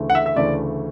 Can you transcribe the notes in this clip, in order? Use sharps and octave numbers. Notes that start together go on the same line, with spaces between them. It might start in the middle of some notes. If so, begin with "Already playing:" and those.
Already playing: D2 C#3 E3 A3
F#5
E5
E5
D2 C#3 E3 A3 D5